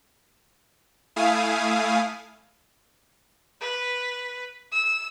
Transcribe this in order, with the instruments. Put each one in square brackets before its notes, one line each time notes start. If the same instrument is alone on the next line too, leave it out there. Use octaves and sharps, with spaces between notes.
[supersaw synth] A3 E4 F5 G#5 D#6
[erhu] B4
E6